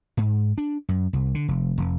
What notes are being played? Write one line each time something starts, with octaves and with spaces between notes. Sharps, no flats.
G#2
D4
F#2
C2
D3
F1
F1